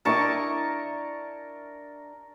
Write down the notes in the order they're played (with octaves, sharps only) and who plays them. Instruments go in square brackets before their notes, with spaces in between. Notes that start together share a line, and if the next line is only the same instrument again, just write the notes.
[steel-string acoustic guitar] D4 E4 D#5 [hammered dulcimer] A#4 A5 C#6